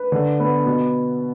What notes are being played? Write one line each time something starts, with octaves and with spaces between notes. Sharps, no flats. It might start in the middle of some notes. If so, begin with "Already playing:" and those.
Already playing: B4
D3
B3
B2